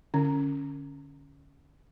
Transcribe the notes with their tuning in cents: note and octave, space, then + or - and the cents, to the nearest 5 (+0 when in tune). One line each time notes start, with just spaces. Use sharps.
D3 +0 C#4 +0